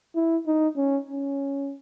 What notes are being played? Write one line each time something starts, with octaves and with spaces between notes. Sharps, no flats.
E4
D#4
C#4
C#4